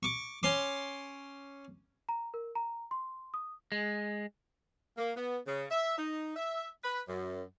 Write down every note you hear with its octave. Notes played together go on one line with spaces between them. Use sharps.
C#6 D6
C#4 C6 D6
A#5
A#4
A#5
C6
D#6
G#3
A#3
B3
C#3
E5
D#4
E5
B4
F#2